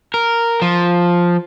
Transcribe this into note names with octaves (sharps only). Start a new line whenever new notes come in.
A#4
F3